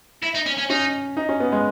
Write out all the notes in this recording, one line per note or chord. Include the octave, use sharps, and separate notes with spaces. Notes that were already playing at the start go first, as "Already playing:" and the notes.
E4
D#4
C#4
C#4
C#4 D#4
D#4
C#4
B3
G#3